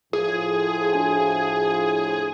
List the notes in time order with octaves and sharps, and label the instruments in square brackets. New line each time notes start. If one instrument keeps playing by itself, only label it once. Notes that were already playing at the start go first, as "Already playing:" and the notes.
[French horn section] A2 F3 [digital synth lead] G#4
[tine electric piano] D4 F#4 G#5